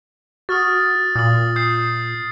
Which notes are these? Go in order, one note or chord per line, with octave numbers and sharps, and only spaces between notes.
F#4 D#6 F6 A6
A#2 D#6 F#7
D#6 G6 C7